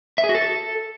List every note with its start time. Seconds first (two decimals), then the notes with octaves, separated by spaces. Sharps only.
0.18 E5
0.24 G#4
0.29 F#4
0.35 A4